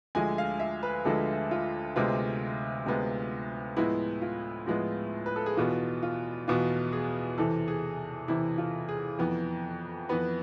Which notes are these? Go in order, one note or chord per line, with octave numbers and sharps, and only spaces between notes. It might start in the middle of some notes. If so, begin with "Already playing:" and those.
D2 D3 F3 G#3 G#5
F5
E5
B4
D2 D3 F3 G#3 A4
F4
D2 C3 G#3 B3 F4
D2 C3 G#3 B3
A2 F3 G#3 B3 E4
F4
A2 F3 G#3 B3
B4
A4
G#4
E2 B2 B3 F4
F4
E2 B2 B3 F4
G#4
E2 C3 E3 A4
G#4
E2 C3 E3 E4
F4
G#4
F2 E3 B3
F2 E3 B3 B4